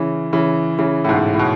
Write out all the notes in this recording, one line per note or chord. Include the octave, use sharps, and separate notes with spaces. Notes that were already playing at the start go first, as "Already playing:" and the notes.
Already playing: C#3 E3
C#3 E3
C#3 E3
A2
G#2 B2
A2
B2